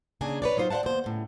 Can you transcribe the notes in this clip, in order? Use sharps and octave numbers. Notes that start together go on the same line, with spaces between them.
D#2 C#3 D4 D#4 G#4 G#5
B4 C#5 D5
F#3 D#4 F4 C5
C5 D5 F5 F#5 A5
D#2 B2 C5
A2 C#3